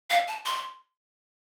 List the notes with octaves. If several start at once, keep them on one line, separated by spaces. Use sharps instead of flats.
F5
A5
C6